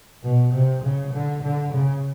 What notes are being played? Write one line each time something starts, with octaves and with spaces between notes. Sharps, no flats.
B2
C3
C#3
D3
D3
C#3